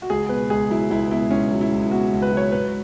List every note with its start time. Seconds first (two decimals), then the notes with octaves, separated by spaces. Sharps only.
0.02 F#4
0.10 C#2 G#4
0.29 B2 B4
0.50 C#2 G#4
0.70 F#3 E4
0.90 C#2 E4
1.11 B2 E4
1.31 C#2 C#4
1.51 F#3
1.61 E4
1.72 C#2
1.91 B2 F#4
2.12 C#2
2.22 B4
2.32 F#3
2.37 C#5
2.52 G#2 B4